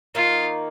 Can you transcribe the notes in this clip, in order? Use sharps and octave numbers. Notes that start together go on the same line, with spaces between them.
D#3 A#3 D#4 F4